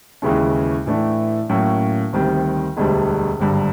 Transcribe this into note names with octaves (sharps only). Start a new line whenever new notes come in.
D#2 C#3 E3 G#3 C#4
A2 E3 A3 D4
A2 F#3 A#3 C#4
D2 C3 D#3 G3
E1 D2 D3 G3
G#1 G2 D3